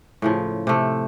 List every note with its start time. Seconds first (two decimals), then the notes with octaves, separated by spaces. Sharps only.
0.22 A2 C#3 F3
0.67 C3 A3